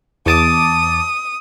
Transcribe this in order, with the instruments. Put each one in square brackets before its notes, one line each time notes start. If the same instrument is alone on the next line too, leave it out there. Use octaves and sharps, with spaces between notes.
[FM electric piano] E2 A5 D6 [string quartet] D#6